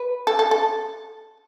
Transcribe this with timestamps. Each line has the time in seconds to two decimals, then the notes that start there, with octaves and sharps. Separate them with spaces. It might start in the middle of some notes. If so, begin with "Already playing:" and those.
Already playing: B4
0.27 A4
0.39 A4
0.51 A4